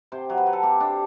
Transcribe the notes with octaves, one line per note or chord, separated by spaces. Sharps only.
C3 C5
F#3
B4
F#3
A4
C3 G4
C3 D4